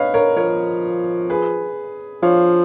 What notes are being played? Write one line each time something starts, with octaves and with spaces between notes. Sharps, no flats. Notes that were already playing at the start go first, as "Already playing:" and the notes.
Already playing: B4 C#5 D#5 F5
A#4 C#5
F3 A#4 C#5
G#4 B4
F3 C#5 F5